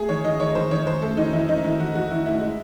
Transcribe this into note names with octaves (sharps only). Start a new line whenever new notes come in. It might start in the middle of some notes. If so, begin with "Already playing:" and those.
Already playing: A3 G#4
D#3 C#5
D#3 D#5
D#3 C#5
D#3 C5
D#3 C#5
D#3 C5
A3 A4
D#3 D#4
D#3 E4
D#3 D#4
D#3 E4
D#3 F#4
D#3 F#4
D#3 E4
A3 E4
G#3